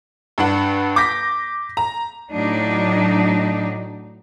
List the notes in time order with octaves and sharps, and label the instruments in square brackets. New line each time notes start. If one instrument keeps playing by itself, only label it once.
[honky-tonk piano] G2 D4 F#5
D6 G6 A#6 B6
A#5
[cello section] A2 F#3 D4 D#4